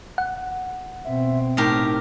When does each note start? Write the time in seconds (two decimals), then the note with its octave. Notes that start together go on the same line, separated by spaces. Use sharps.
0.18 F#5
1.05 B2 C4 E5
1.57 A2 D#4 G4 A#4